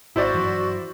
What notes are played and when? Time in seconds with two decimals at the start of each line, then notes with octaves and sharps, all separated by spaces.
0.16 G#1 E4 F#4 C5 D5
0.34 G2 E3 F#3